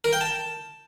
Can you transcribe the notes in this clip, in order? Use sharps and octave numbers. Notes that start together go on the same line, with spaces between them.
A#4
G5
A5